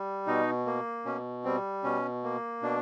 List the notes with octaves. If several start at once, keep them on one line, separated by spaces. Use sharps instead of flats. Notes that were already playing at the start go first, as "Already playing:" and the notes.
Already playing: G3
B2 D#4
A#3
B2 C#4
G3 C4
B2 C#4
A#3
B2 D4